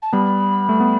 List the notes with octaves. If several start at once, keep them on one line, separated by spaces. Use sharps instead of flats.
A5
G3 B3 B5
A3
B3